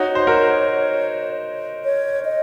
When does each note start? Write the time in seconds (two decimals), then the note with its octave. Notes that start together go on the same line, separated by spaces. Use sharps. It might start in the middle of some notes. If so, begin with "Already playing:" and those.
Already playing: D#4 F#4 C#5
0.15 C5
0.27 F#4 A#4
1.85 C#5
2.25 D#5